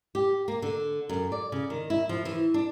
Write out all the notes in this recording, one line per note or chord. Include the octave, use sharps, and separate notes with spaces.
G4
A#3
D3
F#2
D5
C#3
D#3
E4
F3
E3
D4